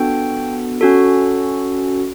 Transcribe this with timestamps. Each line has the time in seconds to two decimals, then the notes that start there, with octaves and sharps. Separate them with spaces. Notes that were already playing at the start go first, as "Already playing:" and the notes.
Already playing: B3 D4 F#4 A4 G5
0.81 C#4 F#4 A4